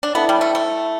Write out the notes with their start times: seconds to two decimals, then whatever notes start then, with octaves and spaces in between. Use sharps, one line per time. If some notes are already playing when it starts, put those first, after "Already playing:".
0.03 D4
0.15 B3 E4 A4 E5 A5
0.29 G3
0.41 A3
0.55 A3